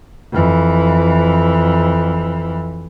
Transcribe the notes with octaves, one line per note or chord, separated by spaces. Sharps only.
F2 E3